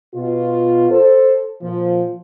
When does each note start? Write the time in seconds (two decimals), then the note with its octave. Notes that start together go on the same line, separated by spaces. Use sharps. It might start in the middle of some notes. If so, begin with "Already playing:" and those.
0.14 B2 F4
0.90 A4 C5
1.62 A#2 F3